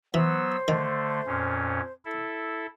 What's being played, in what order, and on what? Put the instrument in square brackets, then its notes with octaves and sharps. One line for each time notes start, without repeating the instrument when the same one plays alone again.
[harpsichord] E3 [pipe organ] F#3 B3 E6 [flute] C5
[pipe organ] D3 A3 [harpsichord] D#3
[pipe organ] F2 A#2 C#4
E4 A4